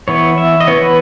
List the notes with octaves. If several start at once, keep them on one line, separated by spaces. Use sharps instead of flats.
E3 B3 C#5
E5
D#5
E3 B3 C#5
B4